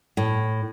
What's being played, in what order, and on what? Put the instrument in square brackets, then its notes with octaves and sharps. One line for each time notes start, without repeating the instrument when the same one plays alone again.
[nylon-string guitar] A2